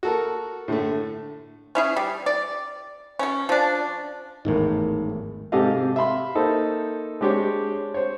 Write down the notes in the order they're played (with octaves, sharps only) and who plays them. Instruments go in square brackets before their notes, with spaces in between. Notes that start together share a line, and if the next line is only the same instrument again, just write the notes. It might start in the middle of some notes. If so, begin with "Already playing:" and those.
[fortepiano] F#4 A4 A#4
A2 D3 A3
[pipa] C#4 E4 G#4
G3
D5
B2 C#4
F3 D4
[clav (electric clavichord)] G#1 E2 A2 [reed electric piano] D#4 A#4
[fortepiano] G#2 C3 G4 A4 D#5 F5
C3
E5 F5 B5 C6
A#3 D#4 A4 C5
G#3 D4 G4 C5 C#5
C5 C#5